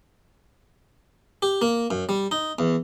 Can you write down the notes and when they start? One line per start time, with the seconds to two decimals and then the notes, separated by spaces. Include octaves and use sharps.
1.42 G4
1.62 A#3
1.91 F#2
2.09 G3
2.31 D#4
2.59 E2